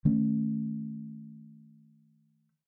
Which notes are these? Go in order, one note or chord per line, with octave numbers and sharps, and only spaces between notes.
D#3 A3 C#4